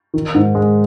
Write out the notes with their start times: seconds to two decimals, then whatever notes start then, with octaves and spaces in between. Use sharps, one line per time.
0.14 D#3
0.35 G#2
0.55 G#3